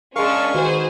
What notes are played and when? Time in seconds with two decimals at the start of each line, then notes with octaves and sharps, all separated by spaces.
0.16 G#3 C#4 D4 A#4 F5 C#6
0.55 D#3 F#4 G#4 B4 C5